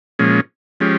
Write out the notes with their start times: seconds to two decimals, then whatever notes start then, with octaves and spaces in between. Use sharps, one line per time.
0.19 A#2 F3 G#3 C#4
0.80 F3 G#3 C#4 G4